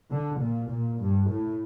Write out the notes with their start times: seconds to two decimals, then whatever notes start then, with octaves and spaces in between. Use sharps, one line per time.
0.11 D3
0.40 A#2
0.70 A#2
1.00 G2
1.29 A2